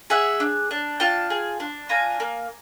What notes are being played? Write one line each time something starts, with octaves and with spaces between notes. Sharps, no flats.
G#4 E5 F#5
D4
D4
F4 G5 A5
G#4
D4
F4 G#5 A#5
A#3